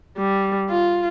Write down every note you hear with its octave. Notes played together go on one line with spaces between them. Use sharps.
G3
F4